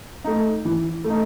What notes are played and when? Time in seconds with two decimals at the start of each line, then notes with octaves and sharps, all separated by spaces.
0.24 A3 D#4
0.65 E3
1.04 A3
1.10 D#4